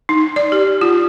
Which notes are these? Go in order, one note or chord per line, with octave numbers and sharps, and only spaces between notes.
D#4
D5
G4
F4